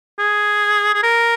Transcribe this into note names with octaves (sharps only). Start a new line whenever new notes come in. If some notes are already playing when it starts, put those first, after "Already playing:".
G#4
G#4
A#4